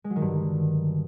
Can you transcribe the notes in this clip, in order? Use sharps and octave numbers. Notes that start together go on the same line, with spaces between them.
G#3
F#3
D#3
G2
D3